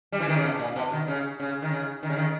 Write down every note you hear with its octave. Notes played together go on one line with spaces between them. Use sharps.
G3
E3
D#3
C#3
B2
A#2
B2
D#3
C#3
C#3
D#3
C#3
D#3
C#3
D#3